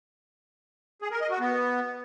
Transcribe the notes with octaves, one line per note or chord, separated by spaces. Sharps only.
G#4
A#4
D#5
F#4
B3